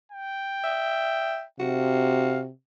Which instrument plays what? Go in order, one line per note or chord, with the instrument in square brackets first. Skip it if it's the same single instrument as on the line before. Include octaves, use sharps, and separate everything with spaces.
[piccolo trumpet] G5
[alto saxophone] E5
[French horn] C3 [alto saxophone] F#4 [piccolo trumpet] F5